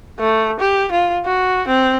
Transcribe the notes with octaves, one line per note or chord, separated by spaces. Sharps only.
A3
G4
F4
F#4
C4